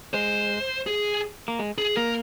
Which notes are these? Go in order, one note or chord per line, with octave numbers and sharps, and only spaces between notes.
G#3 C5
G#4
A#3
G#3
G#4
A#3 A#4